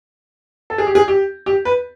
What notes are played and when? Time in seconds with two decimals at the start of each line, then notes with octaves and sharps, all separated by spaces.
0.70 A4
0.78 G#4
0.87 G4
0.95 G#4
1.08 G4
1.46 G4
1.65 B4